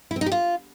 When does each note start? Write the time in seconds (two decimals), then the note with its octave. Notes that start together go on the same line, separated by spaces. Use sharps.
0.11 E4
0.16 C4
0.21 D#4
0.26 G4
0.32 F4